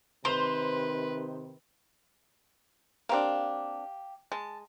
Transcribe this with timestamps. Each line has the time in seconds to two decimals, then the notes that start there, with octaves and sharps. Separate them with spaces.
0.25 C3 D#3 B4 C5 C6 F7
3.09 A#3 C4 D4 G4 F5
4.32 G#3 A5